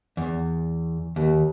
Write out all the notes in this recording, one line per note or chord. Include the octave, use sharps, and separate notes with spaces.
E2
D#2